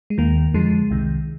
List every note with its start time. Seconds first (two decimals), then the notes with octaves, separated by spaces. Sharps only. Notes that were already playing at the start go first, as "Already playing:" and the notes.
0.10 G#3
0.18 D#2 D#3 A#3
0.54 F2 D3 F3 G#3
0.90 C2 C3 D#3